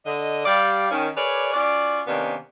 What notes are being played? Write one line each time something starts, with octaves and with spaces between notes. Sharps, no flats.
D3 D#5
G3 D5 F5
D#3 C#4
G#4 A#4 B4 C#5 D5
C#4 F4 F#4 D5
C3 D#3 A#3 B3 C#4 D4